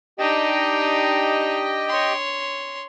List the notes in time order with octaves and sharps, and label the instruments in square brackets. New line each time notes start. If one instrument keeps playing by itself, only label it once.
[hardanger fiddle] D4 D#4 [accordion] G4 D#5 G5
[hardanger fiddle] C#5 C6